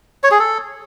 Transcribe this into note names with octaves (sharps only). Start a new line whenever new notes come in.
C#5
G#4
A4